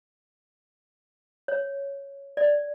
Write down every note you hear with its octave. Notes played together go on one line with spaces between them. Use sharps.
C#5
D5